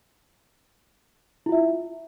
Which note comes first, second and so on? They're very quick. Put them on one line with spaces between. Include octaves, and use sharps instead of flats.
E4 F4 E5